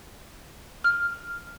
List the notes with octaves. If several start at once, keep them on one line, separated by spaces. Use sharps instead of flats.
F6